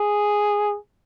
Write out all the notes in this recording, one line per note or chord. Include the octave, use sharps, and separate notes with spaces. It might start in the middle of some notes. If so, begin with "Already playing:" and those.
Already playing: G#4